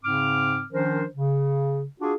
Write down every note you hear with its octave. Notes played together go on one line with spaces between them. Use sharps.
G#2 C#3 C4 D6 F6
D#3 F3 C#4 D4 A#4 C5
C#3
D4 F4 F#4 G#4